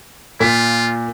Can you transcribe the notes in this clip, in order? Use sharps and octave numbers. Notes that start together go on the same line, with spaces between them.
A#2 F4 B6